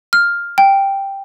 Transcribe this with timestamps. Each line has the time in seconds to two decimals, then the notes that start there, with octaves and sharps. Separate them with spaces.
0.13 F6
0.58 G5